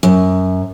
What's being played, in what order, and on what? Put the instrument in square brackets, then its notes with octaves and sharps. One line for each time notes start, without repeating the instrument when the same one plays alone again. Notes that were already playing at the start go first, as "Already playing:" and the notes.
[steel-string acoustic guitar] F#2